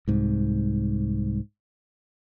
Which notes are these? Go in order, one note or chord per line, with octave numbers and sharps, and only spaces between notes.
C2 G#2